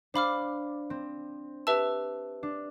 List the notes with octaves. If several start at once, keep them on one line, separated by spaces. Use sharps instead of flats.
D4 C5 F5 B5 D6 F6
C4
G4 B4 E5 A5 E6
D4